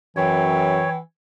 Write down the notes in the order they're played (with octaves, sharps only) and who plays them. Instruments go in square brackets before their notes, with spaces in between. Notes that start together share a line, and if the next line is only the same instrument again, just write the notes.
[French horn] F#2 [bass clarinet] E3 [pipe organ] C#5 [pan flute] G5